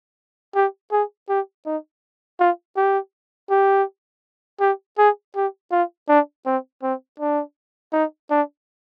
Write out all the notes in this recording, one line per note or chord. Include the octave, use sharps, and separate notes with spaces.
G4
G#4
G4
D#4
F4
G4
G4
G4
G#4
G4
F4
D4
C4
C4
D4
D#4
D4